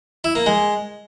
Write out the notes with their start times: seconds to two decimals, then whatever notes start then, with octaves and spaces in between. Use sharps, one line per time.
0.24 E4
0.35 A#3
0.46 G#3